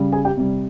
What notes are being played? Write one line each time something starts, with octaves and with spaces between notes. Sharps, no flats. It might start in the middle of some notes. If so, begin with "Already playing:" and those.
Already playing: C#3 G3
G#4 G#5
G4 G5
C3 G3